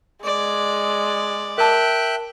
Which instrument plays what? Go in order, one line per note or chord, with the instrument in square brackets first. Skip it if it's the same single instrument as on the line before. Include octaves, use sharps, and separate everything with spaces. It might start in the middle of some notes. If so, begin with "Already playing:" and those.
[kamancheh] G#3 [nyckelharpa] D5
[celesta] A#4 A5 [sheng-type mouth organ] E5 G5 F#6